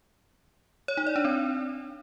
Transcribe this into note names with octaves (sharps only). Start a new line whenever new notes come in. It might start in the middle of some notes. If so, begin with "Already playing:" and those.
C#5
D#4
D5
D4
C4